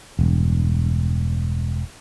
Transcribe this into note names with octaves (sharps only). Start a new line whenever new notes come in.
E1 G2